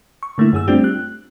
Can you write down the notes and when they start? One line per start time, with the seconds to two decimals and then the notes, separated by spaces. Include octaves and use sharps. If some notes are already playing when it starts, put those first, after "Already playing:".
0.23 C#6
0.38 D3 A3 A#3 E4
0.53 F#2 G#4 E6
0.68 G3 A3 C4 D4 F4 G4
0.84 F#6